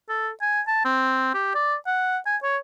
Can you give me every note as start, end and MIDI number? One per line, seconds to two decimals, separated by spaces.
0.10 0.30 69
0.42 0.61 80
0.67 0.83 81
0.85 1.30 60
1.34 1.53 67
1.55 1.75 74
1.87 2.18 78
2.26 2.37 80
2.43 2.57 73